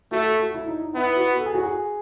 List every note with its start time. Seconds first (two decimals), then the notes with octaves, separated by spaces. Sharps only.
0.12 A3 F#4
0.26 A4
0.40 F#4
0.54 E4
0.68 D#4
0.82 D#4
0.95 B3 E4
1.16 F#4
1.37 A4
1.46 G#4
1.55 F#4
1.63 G#4